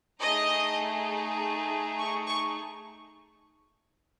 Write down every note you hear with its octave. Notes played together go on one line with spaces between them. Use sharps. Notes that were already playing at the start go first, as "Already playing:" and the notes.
A3 D#4 G#4 D#5
C#6
C#6